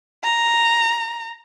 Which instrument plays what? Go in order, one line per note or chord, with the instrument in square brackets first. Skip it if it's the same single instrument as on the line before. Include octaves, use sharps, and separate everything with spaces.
[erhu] A#5